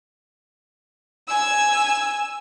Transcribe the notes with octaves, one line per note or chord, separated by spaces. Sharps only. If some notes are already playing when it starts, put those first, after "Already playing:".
G#5 E6